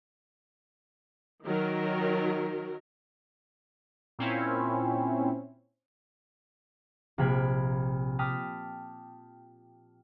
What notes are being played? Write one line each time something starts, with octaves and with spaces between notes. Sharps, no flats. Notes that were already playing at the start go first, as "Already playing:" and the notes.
D#3 F#3 A#4
A#2 C4 C#4 E4
A#1 C3 F5 B5 G#6 D7
G5 A5 D6 D#6 F6 B6